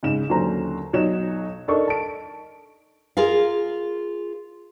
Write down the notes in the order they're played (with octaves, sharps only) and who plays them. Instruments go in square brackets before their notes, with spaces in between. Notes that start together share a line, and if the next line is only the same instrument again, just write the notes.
[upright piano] G#2 C#3 E7
D#2 D3 F#3 C#4 C5 A#5
B1 F#3 D#4 C#5 E7
D4 D#4 A4 A#4 D#5 C#6
A5 D7
[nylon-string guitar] F4 G#4 A#4 F5